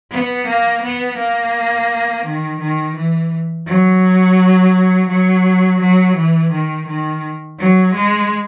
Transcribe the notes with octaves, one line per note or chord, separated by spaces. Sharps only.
B3
A#3
B3
A#3
D#3
D#3
E3
F#3
F#3
F#3
E3
D#3
D#3
F#3
G#3